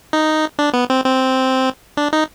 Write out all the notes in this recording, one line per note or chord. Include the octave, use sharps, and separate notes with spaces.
D#4
D4
B3
C4
C4
D4
D#4